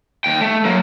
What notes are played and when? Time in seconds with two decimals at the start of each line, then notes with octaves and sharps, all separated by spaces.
0.24 D#2 G5
0.41 A3
0.65 F#3 A#3